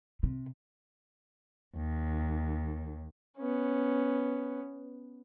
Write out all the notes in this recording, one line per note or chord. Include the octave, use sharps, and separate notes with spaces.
C3
D#2
B3 C#4